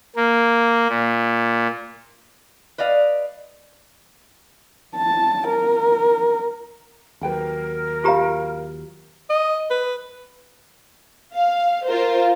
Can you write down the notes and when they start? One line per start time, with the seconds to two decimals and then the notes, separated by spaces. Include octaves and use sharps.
0.16 A#3
0.89 A#2
2.78 B4 D5 D#5 F5
4.96 A5
5.48 A#4
7.21 D#2 F#3 A#4 B4 G5 B5
8.04 F4 G4 C5 F5 A#5
9.30 D#5
9.70 B4
11.35 F5
11.86 F4 A#4 C5